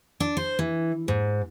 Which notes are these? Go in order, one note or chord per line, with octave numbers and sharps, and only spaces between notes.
D4
C5
E3
G#2